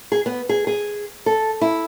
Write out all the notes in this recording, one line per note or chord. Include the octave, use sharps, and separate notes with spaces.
G#4
B3
G#4
G#4
A4
E4